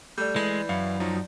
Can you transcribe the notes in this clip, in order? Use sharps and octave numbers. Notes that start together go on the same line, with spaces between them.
G3 A3 A4 D5 G6
E3 G#3
F#2 E4 F5
F3 F#3 D#4